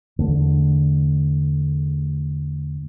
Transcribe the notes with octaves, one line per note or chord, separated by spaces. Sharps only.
E2 D3 A3